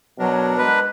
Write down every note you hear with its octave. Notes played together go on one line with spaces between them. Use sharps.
B2 F#3 D4 A#4
G#3 B4